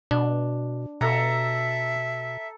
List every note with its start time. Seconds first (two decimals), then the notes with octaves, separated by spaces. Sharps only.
0.11 B2 D4
1.01 B2 A4 E5 A#5